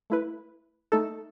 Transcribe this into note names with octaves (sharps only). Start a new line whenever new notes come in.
A3 E4 B4
A3 D#4 A4